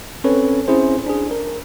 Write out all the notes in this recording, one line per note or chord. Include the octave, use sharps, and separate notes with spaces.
C4 C#4 A4 B4 C#5
C4 C#4 E4 G#4 C5
D4 G#4
A#4